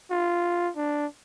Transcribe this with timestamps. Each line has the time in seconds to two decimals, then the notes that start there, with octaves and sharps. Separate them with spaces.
0.11 F4
0.77 D4